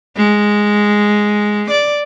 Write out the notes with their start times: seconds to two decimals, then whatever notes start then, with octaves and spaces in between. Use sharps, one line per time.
0.17 G#3
1.70 D5